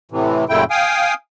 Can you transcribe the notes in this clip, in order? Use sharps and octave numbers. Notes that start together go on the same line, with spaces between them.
A2 C3 E3
F#2 A#2 C#3 A3 E4 G5
F5 G5 G#5 D#6